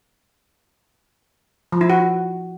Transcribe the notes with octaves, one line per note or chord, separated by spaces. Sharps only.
F3
E4
F#4